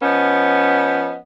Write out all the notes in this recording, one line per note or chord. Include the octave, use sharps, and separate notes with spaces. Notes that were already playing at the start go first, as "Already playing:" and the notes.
F3 B3 C#4 D#5